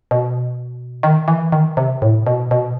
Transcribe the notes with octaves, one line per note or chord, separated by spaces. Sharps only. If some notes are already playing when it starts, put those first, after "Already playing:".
B2
D#3
E3
D#3
C3
A2
B2
B2